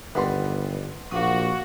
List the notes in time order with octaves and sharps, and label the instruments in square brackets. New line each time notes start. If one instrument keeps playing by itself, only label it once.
[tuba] G1 [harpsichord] D#3 G3 [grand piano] B4 F#5 C6
[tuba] A#1 [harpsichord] A#3 D#6 [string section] F#4